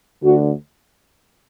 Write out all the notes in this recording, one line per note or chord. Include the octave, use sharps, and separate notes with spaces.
D2 D3 F#4